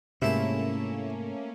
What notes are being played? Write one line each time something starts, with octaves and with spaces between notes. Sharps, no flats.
G#2 C3 A3 A#3 C#4 E4 A5